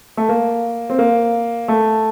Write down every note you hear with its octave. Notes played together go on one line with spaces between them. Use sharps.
A3
A#3
C4
A#3
A3